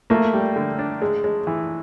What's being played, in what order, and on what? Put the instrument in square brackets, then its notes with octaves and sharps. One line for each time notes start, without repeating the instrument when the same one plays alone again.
[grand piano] A3 [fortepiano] A#3
[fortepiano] G3
D3
D4
G#3
G#3
E3